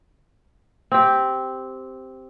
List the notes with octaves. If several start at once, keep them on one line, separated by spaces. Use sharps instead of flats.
C4 G4